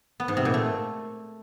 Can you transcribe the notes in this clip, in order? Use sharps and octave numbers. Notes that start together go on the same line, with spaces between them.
B3
G#2
C3
A#2
A3